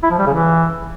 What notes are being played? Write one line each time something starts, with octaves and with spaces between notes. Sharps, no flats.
E4
F3
G3
C#3
E3